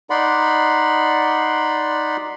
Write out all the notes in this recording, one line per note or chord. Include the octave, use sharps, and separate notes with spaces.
D#4 D5 F#5 B5 C6